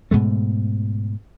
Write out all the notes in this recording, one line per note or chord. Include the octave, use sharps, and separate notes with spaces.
G#2 B2 G#3 A3